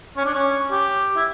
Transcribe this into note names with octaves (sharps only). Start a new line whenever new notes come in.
C#4
D4
C#4
G4
E4